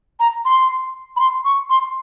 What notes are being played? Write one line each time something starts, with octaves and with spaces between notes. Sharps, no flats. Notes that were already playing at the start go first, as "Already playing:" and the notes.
A#5
C6
B5
C6
C#6
C6